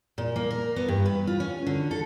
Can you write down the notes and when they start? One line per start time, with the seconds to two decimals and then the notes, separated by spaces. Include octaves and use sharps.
0.18 A#2
0.36 A#3
0.51 A#4
0.76 B3
0.88 G2
1.06 B4
1.27 F4
1.40 C#4
1.66 D3
1.91 A4